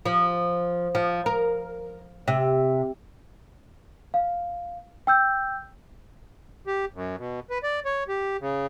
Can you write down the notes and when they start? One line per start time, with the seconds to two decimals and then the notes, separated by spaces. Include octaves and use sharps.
0.06 F3
0.95 F3
1.26 A#4
2.28 C3
4.14 F5
5.07 G5 E6 G6
6.67 G4
6.94 F#2
7.17 B2
7.50 B4
7.63 D5
7.85 C#5
8.08 G4
8.41 C#3